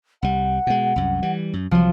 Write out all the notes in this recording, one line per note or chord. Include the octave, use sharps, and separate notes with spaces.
C2 G3 F#5
B2 G#3
C2 F#2
E3 G3
F#2
C2 F3 F#3